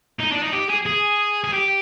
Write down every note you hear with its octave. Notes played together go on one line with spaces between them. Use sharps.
D#4
D4
D#4
G4
G#4
G#4
G#4
G4